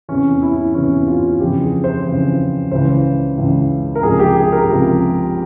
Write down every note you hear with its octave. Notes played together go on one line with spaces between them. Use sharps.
E2 C3 E3 C#4
E4
E2 C3 E3 C#4
F4
F2 C#3 E3 G4
G#4
C5
F2 C#3 E3
C#2 C#3 E3 C5
C#2 C#3 E3
A#4
C#2 C3 F3 G#4
G4
G#4
A#4
C#2 C3 F3